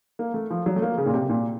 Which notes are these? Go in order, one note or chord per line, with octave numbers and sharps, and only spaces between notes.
A#3
A3
F3
F#3
A3
A#3
C#3
A#2
C3
A#2